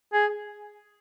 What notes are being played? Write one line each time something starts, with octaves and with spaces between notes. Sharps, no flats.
G#4